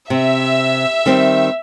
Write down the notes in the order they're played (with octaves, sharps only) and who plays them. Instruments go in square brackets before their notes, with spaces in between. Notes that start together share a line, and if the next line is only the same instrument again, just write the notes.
[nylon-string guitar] C3 [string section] E5
[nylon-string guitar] D#3 G3 C4